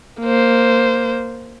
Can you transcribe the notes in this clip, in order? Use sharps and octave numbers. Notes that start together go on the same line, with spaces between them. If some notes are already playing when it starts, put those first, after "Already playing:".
A#3 C5